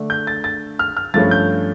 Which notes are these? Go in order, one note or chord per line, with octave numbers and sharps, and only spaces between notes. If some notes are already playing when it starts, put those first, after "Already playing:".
Already playing: D3 A3 D4
G6
A6
A6
F6
F6
G2 F3 A3 C#4 A6
G6